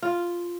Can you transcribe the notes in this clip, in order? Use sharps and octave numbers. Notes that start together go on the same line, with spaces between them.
F4